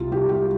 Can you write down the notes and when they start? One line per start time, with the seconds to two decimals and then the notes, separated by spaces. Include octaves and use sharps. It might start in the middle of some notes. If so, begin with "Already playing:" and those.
Already playing: C2 F4
0.12 C2 G4
0.29 G4